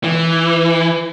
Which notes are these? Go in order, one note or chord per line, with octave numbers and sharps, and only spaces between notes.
E3